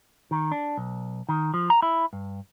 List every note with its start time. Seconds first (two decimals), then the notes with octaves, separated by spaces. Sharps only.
0.31 D#3
0.52 D4
0.77 B1
1.29 D#3
1.54 F3
1.70 A#5
1.82 E4
2.13 G2